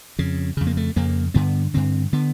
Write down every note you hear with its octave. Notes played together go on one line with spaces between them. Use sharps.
F2 C#3
F2 C#3
A#3
A3
F2 C#3 A#3
G2 D3 B3
G2 D3 C4
D3 B3